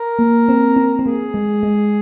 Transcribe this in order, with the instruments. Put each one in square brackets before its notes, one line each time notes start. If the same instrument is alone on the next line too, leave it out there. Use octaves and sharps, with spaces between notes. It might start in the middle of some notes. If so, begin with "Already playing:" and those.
Already playing: [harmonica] A#4
[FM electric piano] A#3
C4
C4
C4
[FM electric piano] A#3 [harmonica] G#4
[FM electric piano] G#3
G#3